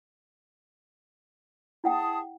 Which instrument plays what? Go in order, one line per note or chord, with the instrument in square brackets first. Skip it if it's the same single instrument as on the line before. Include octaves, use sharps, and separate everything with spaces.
[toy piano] E4 F#5 G5 [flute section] G#4 A5 D#6